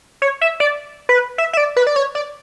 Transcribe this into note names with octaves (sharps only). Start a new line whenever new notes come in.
C#5
E5
D5
B4
E5
E5
D5
B4
D5
C#5
D5